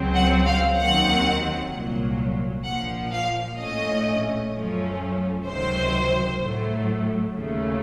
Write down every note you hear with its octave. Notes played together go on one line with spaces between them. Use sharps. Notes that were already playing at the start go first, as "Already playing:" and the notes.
Already playing: C#2 C#3 F#3 C4
F#5
F5
D#2 D#3 F#3 C4 F#5
C2 A#2 F#3
A#1 A#2 F3 F#5
F5
A#1 A2 A3 C#4 D#5
F#2 F3 A3 C#4
C#2 C3 D#3 F#3 C5
A2 F#3 A3
D#2 C#3 A3